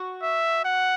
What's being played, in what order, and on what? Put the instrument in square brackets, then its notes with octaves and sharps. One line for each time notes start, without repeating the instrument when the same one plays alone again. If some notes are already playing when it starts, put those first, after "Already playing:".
Already playing: [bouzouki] F#4
[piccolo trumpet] E5
F#5